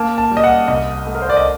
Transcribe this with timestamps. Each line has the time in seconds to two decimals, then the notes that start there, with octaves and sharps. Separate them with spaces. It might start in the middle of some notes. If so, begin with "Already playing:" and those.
Already playing: A#3 A5
0.18 A5
0.31 G3
0.37 D#5
0.44 F#5
0.68 C2 D#5
1.07 A3
1.15 A#4
1.22 C5
1.30 D5
1.37 D#5